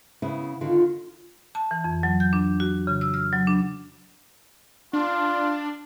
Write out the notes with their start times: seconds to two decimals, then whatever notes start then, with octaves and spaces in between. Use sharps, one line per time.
0.22 C#3 B3 E4
0.61 D3 D#3 F4
1.55 A5
1.71 E3
1.84 F2
2.03 F#3
2.20 G6
2.33 D4
2.60 F#4
2.87 C#3
3.01 E6
3.14 F6
3.33 F#3
3.47 D4
4.93 D4 F4